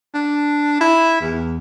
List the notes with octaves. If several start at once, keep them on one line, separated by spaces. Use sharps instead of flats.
D4
E4
E2